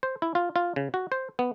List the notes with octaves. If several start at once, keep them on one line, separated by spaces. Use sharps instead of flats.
C5
E4
F4
F4
C#3
F#4
C5
B3